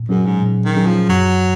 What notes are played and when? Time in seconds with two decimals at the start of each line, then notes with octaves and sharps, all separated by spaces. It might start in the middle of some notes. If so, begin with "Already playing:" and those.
Already playing: A#2
0.08 F#2 F#3 C#4 G#4
0.25 G#2
0.42 A#2
0.65 D#3
0.76 F#3 C#4 G#4
0.87 F3
1.09 F#2 F#3